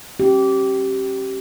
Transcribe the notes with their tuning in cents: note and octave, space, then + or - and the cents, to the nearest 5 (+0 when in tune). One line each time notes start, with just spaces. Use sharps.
C#4 -40 G4 -20